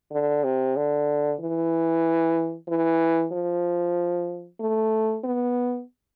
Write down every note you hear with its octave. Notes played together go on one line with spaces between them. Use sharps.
D3
C3
D3
E3
E3
F3
A3
B3